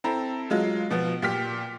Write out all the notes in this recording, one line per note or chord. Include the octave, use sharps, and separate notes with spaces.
C4 E4 A4 A#5
F#3 G#3 F4
B2 F3 B3
A#2 G4 F6 B6